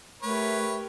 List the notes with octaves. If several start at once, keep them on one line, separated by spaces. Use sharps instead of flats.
A3 G4 A#4 B4 C#5